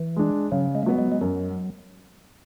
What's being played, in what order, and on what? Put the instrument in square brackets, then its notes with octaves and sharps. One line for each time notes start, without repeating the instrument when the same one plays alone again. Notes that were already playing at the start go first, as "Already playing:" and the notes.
Already playing: [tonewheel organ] E3
[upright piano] G#3 D4
[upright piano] C#3 [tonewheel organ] F#3
[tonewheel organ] G#3
A3
[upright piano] F#3 B3 [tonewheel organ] G#3
[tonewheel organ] G#3
G#3
[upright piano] F#2 [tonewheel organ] F#3